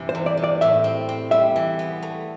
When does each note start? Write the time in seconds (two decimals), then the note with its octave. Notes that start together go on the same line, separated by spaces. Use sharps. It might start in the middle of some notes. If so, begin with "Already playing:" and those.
Already playing: G2 C3 E3
0.09 C5
0.15 E2
0.26 D5
0.37 C3
0.44 D5
0.61 A2 E5
0.84 C4
1.09 C4
1.31 G3 E5
1.56 E3
1.79 B3
2.02 A3